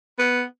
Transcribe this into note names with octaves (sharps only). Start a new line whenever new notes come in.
B3